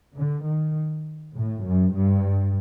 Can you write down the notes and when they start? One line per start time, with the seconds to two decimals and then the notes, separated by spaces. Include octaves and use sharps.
0.17 D3
0.46 D#3
1.35 A2
1.64 F#2
1.94 G2